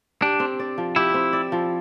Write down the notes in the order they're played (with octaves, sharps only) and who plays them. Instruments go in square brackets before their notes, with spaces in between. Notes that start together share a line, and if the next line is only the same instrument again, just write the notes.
[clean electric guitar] D4 [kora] G4
[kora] C4
D5
F3
[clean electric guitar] E4 [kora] G4
[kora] C4
D5
F3